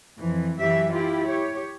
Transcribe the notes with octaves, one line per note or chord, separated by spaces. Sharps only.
F2 E3
F#2 E3 F#3 G4 E5
E4 F4 G4
G4 C#5